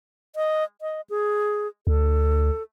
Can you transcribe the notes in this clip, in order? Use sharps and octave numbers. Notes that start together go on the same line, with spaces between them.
D#5
D#5
G#4
D2 A4